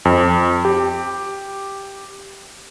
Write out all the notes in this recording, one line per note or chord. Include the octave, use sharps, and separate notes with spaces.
F2
G4